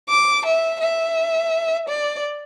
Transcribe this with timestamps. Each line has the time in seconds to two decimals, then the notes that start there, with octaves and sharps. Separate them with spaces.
0.09 D6
0.45 E5
0.80 E5
1.88 D5